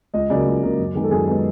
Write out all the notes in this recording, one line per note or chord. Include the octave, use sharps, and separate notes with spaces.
C#2 D#5
C#3 F#3 A#3 D5
C#2
C#3 F#3 A#3
F#2
D#3 G#3 B3
A4
F#2 G#4
D#3 G#3 B3